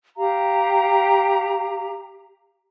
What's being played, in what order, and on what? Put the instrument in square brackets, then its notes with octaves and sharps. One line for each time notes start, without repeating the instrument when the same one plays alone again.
[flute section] G4 F5 A#5